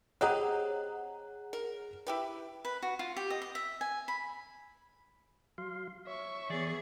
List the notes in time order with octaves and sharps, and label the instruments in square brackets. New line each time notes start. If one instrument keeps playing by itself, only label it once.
[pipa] C4 G4 D#5 [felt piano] G#4 F#6 [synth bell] C#5 F#5 A#5
[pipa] A#4
E4 G4 B4
[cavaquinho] B4
F#4
F4
G4
D#5
D#5
E5
G#5
B5
[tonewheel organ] F#3 F5 C6
[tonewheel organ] C#5 [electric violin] E5 C#6
[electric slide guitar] E3 D5 [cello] B3 G#4